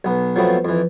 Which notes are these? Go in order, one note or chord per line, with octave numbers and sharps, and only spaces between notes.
B1 B3
F3 F#3 A3 B3 C4
F2 E3